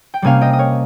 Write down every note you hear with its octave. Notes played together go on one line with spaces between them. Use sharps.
G5
C3 G3 A#3 C#4 F5 G#5
D#5 G5
D#5
A#4 C#5